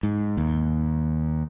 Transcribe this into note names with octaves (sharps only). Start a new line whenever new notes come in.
G#2
D#2